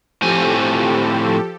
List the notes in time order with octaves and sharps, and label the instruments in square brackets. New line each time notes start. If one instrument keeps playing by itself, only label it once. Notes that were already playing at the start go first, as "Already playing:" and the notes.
[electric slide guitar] A2 C4 G#5 [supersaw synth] F3 G4 A4